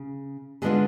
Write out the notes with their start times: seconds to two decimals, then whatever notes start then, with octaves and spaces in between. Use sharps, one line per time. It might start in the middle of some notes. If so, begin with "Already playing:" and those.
Already playing: C#3
0.62 D3 G#3 B3 D4 F4 G#4